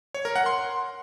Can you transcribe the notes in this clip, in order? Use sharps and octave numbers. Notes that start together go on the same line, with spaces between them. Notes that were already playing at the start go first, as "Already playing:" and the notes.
C#5
A#4
F#5
C6